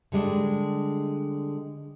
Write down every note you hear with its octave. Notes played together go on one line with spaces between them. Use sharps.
D3 G3 G#3 D4